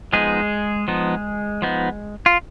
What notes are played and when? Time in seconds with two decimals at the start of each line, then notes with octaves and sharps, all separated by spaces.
0.13 F3 G#3 B3 D#4 G#4
0.88 F3 B3 D#4
1.62 F3 B3 D#4
2.26 F4